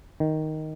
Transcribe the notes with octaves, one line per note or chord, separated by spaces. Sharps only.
D#3